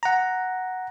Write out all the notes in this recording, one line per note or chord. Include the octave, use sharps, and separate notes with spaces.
F#5 A#5